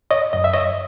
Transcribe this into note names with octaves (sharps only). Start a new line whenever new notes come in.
C#5 D#5
F#2 D#5
E5
C#5 D#5